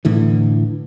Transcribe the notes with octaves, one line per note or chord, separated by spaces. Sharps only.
A2 D3 E3